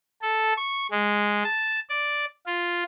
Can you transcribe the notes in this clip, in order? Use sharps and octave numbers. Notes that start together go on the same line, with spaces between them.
A4
C#6
G#3
A5
D5
F4